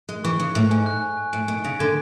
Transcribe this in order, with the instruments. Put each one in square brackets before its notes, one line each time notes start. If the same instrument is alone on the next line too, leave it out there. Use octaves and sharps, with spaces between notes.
[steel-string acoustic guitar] G#3 [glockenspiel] F#6
[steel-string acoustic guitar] E3 [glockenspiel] C#6
[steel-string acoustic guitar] C#3 [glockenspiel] F#6
[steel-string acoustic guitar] A2 [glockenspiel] F#6
[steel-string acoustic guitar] G#2 [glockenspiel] G#5
[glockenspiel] F#6
G#5
G#5
[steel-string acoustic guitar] A2 [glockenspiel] D7
[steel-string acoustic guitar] B2 [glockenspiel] D7
[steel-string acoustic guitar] C#3 [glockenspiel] D7
[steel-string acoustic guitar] D3 [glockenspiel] G#6